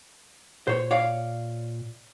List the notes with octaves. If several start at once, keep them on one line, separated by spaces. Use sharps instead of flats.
A#2 C5 C#5
C#5 D5 F5